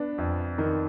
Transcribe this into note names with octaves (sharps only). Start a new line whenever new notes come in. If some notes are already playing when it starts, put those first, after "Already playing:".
Already playing: B3 D4
F2
D#3